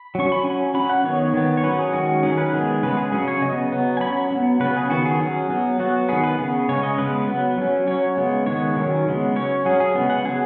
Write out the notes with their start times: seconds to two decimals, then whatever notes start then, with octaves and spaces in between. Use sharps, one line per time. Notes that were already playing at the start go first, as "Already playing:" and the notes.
Already playing: B5
0.15 F#3 C#4 C#6
0.32 B5
0.45 F#3 C#4 G#5
0.74 F#3 C#4 B5
0.89 F#5
1.04 D#3 B3 C#5
1.34 D#3 B3
1.57 C#5
1.63 F#3 C#4 B4
1.79 G#4
1.93 D#3 G#3 C#4 F#4
2.23 D#3 F#3 C#4 G#4
2.38 B4
2.53 D#3 G#3 B3 G#4
2.83 C#3 G#3 B3 B4
2.97 G#4
3.12 C#3 F#3 C#4 G#4
3.28 C#5
3.42 C#3 B3 D#5
3.72 F#3 B3
3.97 G#5
4.01 F#3 C#4 B5
4.31 F#3 B3
4.60 C#3 B3 B4
4.76 G#4
4.90 D#3 B3 F#4
5.06 G#4
5.20 F#3 C#4
5.50 F#3 B3
5.79 F#3 B3 F#4
6.09 D#3 B3 G#4
6.24 B4
6.39 C#3 B3 G#4
6.69 C#3 G#3 C#4 C#5
6.83 D#5
6.98 C#3 G#3 B3 B4
7.27 F#3 B3
7.58 F#3 C#4
7.87 F#3 C#4 C#5
8.17 C#3 G#3 B3
8.46 D#3 G#3 B3 C#5
8.77 D#3 F#3 C#4
9.06 C#3 G#3 B3
9.36 F#3 C#4 C#5
9.65 F#3 C#4 G#4
9.80 G#4
9.95 C#3 G#3 B3
10.10 F#5
10.25 F#3 B3 G#4